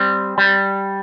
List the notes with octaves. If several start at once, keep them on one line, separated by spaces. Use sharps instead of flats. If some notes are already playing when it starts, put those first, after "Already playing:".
Already playing: G3 C4
G3